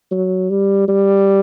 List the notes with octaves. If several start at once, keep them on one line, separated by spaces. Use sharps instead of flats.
F#3
G3
G3